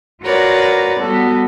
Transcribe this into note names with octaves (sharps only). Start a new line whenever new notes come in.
F4 F#4 A#4 B4 C#5 D5
G3 B3 F#4 A4